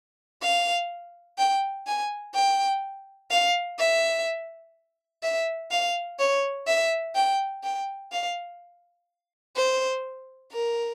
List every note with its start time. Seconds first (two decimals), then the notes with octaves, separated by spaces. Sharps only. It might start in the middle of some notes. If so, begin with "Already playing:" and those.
0.42 F5
1.38 G5
1.87 G#5
2.34 G5
3.30 F5
3.79 E5
5.23 E5
5.71 F5
6.19 C#5
6.67 E5
7.15 G5
7.64 G5
8.12 F5
9.56 C5
10.52 A#4